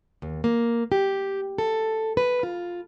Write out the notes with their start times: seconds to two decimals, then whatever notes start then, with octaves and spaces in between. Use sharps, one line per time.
0.22 D#2
0.44 A#3
0.92 G4
1.58 A4
2.17 B4
2.43 F4